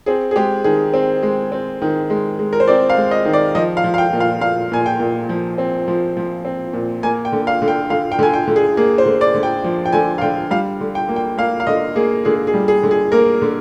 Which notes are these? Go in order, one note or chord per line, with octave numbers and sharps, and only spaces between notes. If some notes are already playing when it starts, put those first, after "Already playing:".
C4 G#4
G#4
G#3 G4
D#3 G#4
C4
G#3
C4
D#3
G#3
G#3
A#4
C5
C4 D5
F5
G#3
D#5
D#3
D5
F3 D#5
F5
F3
F5
G5
A#2
F5
A#2 F5
A#2 G#5
G5
A#2
F3
C4
F3
F3
C4
A#2
A#3 G#5
G5
D3
F5
D3
G5
D3 F5
G5
D3 G#5
G5
D3
G#4
A#3 G#4
C5
D3
D5
D3
G5
F3
G5
D3 G#5
F5
D3 G5
G3 F5
D3
G5
A#3
G5
A#3 F5
F5
D3 D#5
A#3 G#4
D3 G#4
G#4
G3
G#4
D3
G#4
A#3 A#4
D3